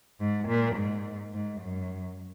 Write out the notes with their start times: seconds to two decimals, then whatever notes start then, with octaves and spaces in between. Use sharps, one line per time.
0.20 G#2
0.48 A#2
0.76 G#2
1.33 G#2
1.61 F#2